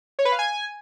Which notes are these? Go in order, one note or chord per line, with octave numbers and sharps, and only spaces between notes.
C#5
B4
F5
G#5